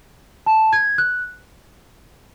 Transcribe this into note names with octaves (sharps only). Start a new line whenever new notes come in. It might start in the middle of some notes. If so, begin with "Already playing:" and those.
A5
G#6
F#6